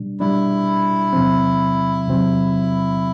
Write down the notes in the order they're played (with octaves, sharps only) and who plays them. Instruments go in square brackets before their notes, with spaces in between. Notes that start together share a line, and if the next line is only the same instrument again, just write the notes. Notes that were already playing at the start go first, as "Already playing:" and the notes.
Already playing: [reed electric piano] B2 G3 D4
[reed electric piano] B2 G3 D4 [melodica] E4
[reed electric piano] E2 C3 F#3 C4
E2 C3 F#3 C4